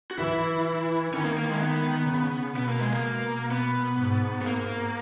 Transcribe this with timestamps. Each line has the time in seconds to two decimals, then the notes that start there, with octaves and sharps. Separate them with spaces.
0.11 F#4
0.18 E3 E4
1.13 D#3 C#4
1.25 A#3
1.37 A#3
1.49 G#3
1.55 A#3
1.61 D#3 B3
2.09 C#3
2.56 B2 B3
2.68 A#3
2.80 G#3
2.93 A#3
3.03 B2
3.51 B3
3.98 G#2
4.42 B3
4.46 A#3